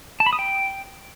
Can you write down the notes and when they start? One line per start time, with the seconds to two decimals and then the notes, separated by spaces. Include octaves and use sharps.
0.20 A5
0.26 B5
0.33 D#6
0.39 G5